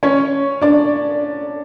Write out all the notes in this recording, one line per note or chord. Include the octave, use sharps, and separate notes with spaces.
C#4 C#5
D4 D5